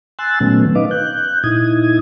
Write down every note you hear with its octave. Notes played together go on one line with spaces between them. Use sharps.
G#5 C6 E6 F#6 A6
A#2 D#3 F#3 A3 B3 C#4
D#4 B4 D#5 F5 D6
F#6 G6
A#2 D#4 E4 D#6 G#6